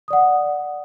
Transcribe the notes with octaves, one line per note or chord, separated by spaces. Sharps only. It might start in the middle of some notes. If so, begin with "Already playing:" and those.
D5 F#5 D#6